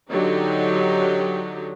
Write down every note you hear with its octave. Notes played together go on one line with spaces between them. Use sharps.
D3 F#3 D#4 G4